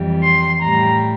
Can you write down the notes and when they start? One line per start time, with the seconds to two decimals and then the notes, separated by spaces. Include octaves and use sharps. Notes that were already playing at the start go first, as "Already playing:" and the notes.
Already playing: F2 E3 G3
0.23 C6
0.61 A2 G3 A#5